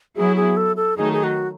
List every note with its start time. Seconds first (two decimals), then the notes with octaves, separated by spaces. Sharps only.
0.16 F#3 B3 E4 G#4
0.36 G#4
0.57 A4
0.76 A4
0.97 D#3 F#3 A3 D#4 G#4
1.13 G#4
1.24 F#4